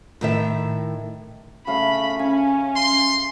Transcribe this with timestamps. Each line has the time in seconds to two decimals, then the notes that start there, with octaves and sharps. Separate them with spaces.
0.21 A2 D#3 E5
1.67 C#3 A3 F5 B5
2.19 C#4 G#5
2.76 C6